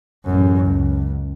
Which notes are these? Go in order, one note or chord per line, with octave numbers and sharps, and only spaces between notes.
A1 F#2
C#2